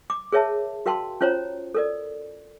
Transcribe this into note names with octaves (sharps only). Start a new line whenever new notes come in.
D6
G#4 A#4 C#5 E5 A5
F#4 A#4 F5 G5 A5 C6
C#4 F4 C5 C#5 A#5
A4 A#4 D5